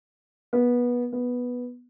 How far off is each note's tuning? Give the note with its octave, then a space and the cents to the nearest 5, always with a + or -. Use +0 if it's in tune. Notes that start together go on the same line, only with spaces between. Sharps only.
B3 -20
B3 -5